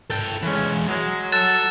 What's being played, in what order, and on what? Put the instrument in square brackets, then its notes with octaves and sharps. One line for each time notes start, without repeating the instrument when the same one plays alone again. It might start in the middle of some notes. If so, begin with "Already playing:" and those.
[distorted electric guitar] A4 G5
[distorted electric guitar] E3 G#3 [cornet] C#4
[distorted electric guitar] F#3 [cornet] G#3
[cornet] A4 [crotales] F#6 A6 E7